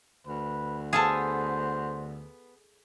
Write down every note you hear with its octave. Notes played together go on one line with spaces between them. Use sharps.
D2 B4
B3 G#4 A4 C5 F5 A5